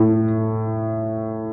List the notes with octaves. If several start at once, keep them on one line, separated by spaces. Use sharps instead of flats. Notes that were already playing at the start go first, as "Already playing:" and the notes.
Already playing: A2